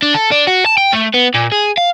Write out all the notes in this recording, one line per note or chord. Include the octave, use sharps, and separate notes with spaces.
D4
A4
D4
F#4
A5
G5
A3
B3
A#2
G#4
F5